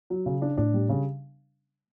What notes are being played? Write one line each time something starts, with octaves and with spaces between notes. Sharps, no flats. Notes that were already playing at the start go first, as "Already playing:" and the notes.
F#3
C#3
D4
A2 D4
G3
C#3